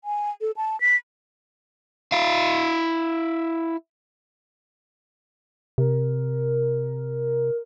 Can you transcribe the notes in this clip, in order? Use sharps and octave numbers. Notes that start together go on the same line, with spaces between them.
G#5
A4
A5
B6
E4 F5
C3 A#4